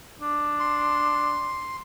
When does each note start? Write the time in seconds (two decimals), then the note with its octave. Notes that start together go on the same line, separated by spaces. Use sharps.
0.21 D4
0.60 C6